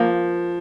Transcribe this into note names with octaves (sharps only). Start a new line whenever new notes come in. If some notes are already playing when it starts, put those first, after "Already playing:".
Already playing: F3 A#3